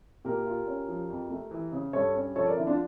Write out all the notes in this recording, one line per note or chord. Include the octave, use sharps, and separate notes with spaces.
A#2 G4 A#4
F4
C#4
F3
F2
A3
E3
C#3
G2 A4 C#5
C#4
F3 A4 C#5
A#4 D5
D3 E4
D4 F4